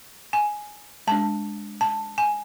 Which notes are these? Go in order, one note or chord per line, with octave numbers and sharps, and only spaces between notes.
G#5
G#3 D4 A5
A5
G#5